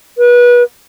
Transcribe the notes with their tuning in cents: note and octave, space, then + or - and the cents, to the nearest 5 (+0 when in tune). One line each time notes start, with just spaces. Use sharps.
B4 -30